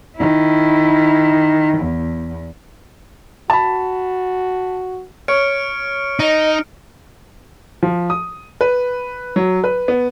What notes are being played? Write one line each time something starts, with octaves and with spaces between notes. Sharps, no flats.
D#3 E4
E2
F#4 A5 B5
C#5 F6 C#7 D7
D#4 D#5
F3
D#6
B4
F#3
B4
B3